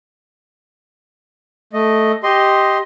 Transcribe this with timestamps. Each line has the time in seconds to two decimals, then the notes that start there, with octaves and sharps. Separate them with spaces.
1.73 A3 D#5
2.23 G4 D#5 C6